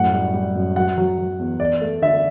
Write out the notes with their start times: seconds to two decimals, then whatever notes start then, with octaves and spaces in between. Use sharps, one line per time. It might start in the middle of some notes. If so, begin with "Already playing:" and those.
Already playing: F#2 A2 F#5
0.13 G3
0.34 G3
0.55 F#2
0.76 F#3 F#5
0.98 F#3
1.18 F#3
1.39 E2
1.60 E2 D5
1.81 A3
2.02 D3 E5